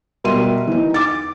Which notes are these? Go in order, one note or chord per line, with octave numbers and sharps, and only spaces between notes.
B2 G3 A#4 E5 C6 D#7
E3 D#4
D6 A6